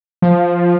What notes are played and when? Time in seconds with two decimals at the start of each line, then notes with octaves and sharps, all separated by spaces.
0.22 F3